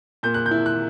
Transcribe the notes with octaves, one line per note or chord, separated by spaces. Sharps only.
A#2 G6
F#6
G6
E4
F#6